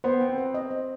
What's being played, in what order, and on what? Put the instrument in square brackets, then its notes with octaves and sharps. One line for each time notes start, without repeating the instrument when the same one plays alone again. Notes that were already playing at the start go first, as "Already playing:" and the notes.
[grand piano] B3 [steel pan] C5
[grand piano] C4 [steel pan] G5
[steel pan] C5
D#5
C5